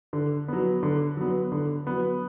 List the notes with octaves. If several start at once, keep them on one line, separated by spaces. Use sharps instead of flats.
D3
F#3 B3
D3
F#3 B3
D3
F#3 B3